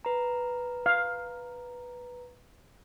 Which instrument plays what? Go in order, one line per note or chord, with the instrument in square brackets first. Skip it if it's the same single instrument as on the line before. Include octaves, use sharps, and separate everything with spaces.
[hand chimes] B4 A#5
[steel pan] F5